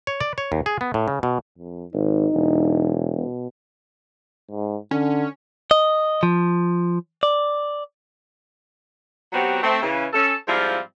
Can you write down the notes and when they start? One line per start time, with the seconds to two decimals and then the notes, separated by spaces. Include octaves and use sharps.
0.07 C#5
0.20 D5
0.38 C#5
0.52 D#2
0.66 G#4
0.81 B3
0.94 A2
1.08 C#3
1.23 B2
1.58 F2
1.94 G#1 D#4
2.34 E1
3.17 B2
4.51 G#2
4.91 D3 C#4
5.71 D#5
6.23 F3
7.23 D5
9.33 F#3 B3 C4 F#4 G4
9.62 A3 C4
9.82 C#3 E3
10.13 C#4 A4
10.47 G#2 F3 G3 C4 E4 F4